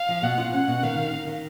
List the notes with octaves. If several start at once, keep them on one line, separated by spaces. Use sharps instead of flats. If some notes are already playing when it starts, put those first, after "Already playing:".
Already playing: F5
F3
B2 F#5
F4
C#4 F#5
B2
D#3 F5
D#3
D#3
D#3